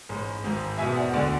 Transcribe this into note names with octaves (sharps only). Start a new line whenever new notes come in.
A1 G#2 G#3
G#1 G#2 G#3
E2 B2 G#3 E5 G#5
D5 F#5
D2 D3 G#3 D5 F#5